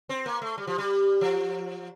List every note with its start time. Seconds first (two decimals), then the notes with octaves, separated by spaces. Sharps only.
0.09 C4
0.26 A#3
0.42 A3
0.58 G3
0.67 F3
0.78 G3
1.21 F3